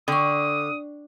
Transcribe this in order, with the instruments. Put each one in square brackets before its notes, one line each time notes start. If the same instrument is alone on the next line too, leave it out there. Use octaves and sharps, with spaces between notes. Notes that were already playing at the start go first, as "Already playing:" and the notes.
[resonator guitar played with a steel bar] D3 [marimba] G5 C#6 [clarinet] D#6